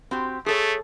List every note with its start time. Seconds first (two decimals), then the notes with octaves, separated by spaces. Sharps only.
0.11 C4 F#4 G4
0.46 A3 G#4 A4 C#5